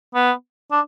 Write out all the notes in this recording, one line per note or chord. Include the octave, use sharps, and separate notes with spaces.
B3
D4